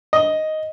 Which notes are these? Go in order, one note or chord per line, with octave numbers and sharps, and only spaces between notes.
D#5